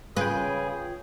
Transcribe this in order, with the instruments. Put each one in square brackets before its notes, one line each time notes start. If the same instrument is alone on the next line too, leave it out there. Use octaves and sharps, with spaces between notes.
[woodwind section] C#3 [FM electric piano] F4 G5 [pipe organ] G#4 [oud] B4